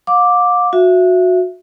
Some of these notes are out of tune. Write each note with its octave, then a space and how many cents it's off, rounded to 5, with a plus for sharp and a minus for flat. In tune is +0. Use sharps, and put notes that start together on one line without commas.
F5 +40 D6 +0
F#4 -20 E5 +15